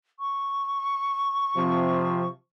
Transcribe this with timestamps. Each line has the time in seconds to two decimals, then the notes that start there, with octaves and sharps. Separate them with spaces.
0.19 C#6
1.56 C3 F3